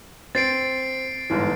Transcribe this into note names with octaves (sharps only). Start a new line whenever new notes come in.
C4 A6 C7 D7
G1 G#2 E3